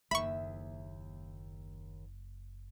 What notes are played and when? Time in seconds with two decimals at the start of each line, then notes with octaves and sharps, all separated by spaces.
0.11 F#1 D#2 B2 E5 B5 C#6